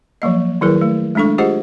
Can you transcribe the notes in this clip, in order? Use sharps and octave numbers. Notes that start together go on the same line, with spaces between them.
F3 F#3 A#3 D#5
D#3 F#3 E4 G#4 A#4 B4
A3
G#3 A3 D4 A4 C#6
F4 G4 G#4 C5 D#5 F#5